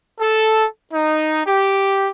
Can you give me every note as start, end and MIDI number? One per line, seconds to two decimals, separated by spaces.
0.20 0.65 69
0.93 1.43 63
1.46 2.09 67